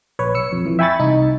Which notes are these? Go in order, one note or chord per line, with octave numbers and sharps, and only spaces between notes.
A#1 B4 C#5
B1 E6 C#7
F2
F2 E3
E5 G5 G#5 B5 C#6 A6
C2 D#4